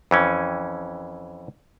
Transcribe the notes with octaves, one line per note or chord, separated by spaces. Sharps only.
F2 E3 C#4